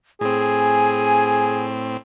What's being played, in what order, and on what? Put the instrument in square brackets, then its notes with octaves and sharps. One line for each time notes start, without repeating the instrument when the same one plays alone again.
[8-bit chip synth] A2 C4 [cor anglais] G#4 [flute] G#5